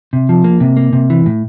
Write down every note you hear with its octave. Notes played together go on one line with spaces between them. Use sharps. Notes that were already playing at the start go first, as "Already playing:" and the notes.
C3
F3
A#3
C3
A#3
C3
E3
A2